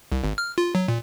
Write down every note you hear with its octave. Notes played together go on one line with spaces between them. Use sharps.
C2
G#1
F6
F4
F#3
A#2